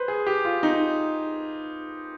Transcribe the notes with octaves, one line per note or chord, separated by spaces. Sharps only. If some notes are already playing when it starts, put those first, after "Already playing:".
Already playing: B4 C5
G#4
G4
F4
D#4